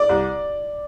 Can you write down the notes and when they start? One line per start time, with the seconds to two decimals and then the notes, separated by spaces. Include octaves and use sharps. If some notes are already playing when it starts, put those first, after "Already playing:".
Already playing: D5 D6
0.09 C2